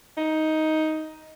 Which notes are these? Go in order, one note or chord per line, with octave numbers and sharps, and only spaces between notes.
D#4